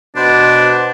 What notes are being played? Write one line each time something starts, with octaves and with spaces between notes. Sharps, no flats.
B2 D4 B4 C5